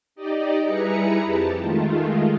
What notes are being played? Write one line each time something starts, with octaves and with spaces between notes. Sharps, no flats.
D#4 G4 D5 D#5
G3 E4 G#4 B4 A#5 C#7
F2 G4 A5
D#3 G#3 A3 F4